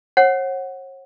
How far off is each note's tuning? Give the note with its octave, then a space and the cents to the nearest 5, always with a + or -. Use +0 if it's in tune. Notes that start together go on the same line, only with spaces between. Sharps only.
C#5 -45 F#5 +0